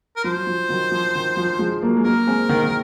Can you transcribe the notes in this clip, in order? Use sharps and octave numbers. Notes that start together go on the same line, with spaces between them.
A#4
F3 C5
F#3
F3
D#3 F#3
F3
D#3
F3
F3 G#3
F#3 A#3
G#3
F#3 A#3 A#4
G#3 C4
D#3
D#3